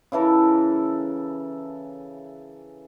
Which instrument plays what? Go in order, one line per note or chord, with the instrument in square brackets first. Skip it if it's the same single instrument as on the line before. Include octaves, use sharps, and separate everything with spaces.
[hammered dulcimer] C#3 E3 A4 A#4